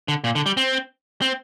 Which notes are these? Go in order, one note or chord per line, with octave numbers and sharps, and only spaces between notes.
D3
A#2
D3
G3
C4
C4